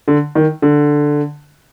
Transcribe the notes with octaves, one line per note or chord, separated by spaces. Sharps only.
D3
D#3
D3